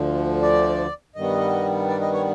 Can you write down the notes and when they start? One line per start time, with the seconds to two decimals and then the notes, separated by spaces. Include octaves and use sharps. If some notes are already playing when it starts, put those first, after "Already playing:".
Already playing: D2 D3 F3
0.42 D5
1.15 G2 D#3 G3 B3 D#5
1.88 D5
2.01 D#5
2.13 C#5